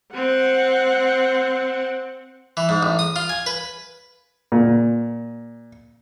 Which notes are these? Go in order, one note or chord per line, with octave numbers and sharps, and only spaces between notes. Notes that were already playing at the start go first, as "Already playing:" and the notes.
C4 F#5
E3
G#2
A1
D#6
F4
G#5
B4
A#2